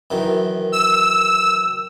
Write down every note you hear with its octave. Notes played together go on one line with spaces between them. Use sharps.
F#2 D#3 E3
E6